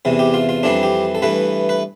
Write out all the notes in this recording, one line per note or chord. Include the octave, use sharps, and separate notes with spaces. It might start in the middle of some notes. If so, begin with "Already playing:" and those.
E2 C3 E3
G4
F4
F4
F2 E3 G3 C4 D4
G4
A4
G2 E3 A3 B4
B4